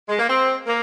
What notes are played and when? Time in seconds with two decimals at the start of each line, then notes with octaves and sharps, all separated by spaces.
0.09 G#3
0.19 A#3
0.29 C4
0.67 A#3